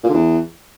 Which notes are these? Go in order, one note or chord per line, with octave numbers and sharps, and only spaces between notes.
A#2
D3
E2